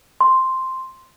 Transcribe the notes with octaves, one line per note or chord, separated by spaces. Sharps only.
C6